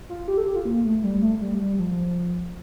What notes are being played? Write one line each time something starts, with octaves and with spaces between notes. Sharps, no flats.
F4
G4
A4
G4
F4
A#3
A3
G3
A3
G3
G3
F3